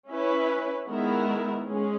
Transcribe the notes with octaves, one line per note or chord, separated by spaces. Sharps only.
C#4 E4 B4
D#3 G#3 B3 E4 A#4
G#3 C#4 G#4